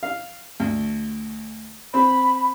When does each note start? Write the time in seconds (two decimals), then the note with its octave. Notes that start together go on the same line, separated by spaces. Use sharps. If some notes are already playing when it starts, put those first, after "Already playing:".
0.03 F5
0.60 D2
1.94 C4 B5